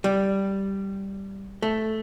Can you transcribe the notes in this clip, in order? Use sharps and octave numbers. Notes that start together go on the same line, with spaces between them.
G3
A3